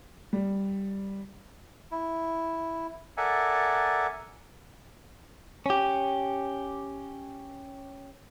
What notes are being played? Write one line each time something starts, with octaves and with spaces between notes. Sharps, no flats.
G3
E4
A4 A#4 D5 E5 F#5 G#5
C#4 G4